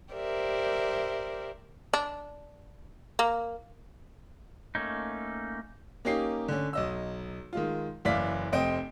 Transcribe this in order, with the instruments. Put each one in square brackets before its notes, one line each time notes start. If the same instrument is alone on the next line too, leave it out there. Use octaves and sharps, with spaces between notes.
[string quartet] G4 A#4 C5 D5 E5
[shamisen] D4
A#3
[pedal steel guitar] A3 A#3 C#4 D#4
[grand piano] A#3 C#4 D#4 G4 C7
D3 C#4
B1 D#5 E6
D#3 G#3 F4
F#1 E3 D5 F5 B6
F1 C4 D#5 G5 D7